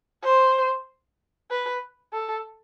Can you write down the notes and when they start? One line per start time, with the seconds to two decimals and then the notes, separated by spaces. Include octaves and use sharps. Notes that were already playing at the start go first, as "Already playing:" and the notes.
0.24 C5
1.51 B4
2.13 A4